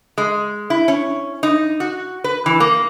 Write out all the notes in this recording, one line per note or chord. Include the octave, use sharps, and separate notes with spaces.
G#3
E4
C#4
D#4
F#4
B4
E3
A#3